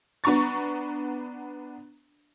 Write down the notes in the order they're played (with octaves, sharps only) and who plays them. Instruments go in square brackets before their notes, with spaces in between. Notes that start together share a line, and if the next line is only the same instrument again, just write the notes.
[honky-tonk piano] B3 D4 A#5 C#6 A6